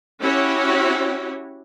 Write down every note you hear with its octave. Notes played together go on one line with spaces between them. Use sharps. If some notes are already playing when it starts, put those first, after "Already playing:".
C#4 E4 F#4 G4 C#5